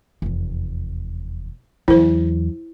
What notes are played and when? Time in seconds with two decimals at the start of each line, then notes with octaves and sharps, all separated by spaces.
0.22 F1 E2
1.88 E2 F#3 E4 C5